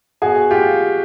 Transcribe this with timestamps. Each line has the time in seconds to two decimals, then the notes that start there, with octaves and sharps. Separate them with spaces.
0.22 B2 F#4 G#4
0.51 F4 G4